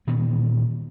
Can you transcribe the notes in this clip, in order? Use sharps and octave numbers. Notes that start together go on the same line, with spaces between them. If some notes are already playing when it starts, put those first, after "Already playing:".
A#2 D#3 E3 B3